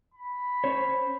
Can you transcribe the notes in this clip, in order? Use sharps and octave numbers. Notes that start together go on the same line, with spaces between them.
B5
C#4 C5 C#5